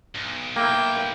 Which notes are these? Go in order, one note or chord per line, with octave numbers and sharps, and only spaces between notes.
B1
A#3 E4 G5